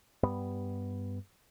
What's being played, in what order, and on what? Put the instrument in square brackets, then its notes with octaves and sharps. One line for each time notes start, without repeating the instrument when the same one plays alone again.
[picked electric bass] G2 G3 B3